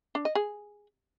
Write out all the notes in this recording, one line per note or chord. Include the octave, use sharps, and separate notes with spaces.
D4
D#5
G#4